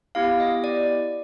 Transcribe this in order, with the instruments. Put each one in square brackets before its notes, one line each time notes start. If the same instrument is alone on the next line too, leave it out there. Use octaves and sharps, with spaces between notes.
[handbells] B3 E4 G4 F5
D#5
D5